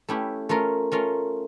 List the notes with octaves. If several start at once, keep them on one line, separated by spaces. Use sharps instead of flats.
A3 C#4 E4 G4
A3 C#4 F4 A#4
A3 C#4 F4 A#4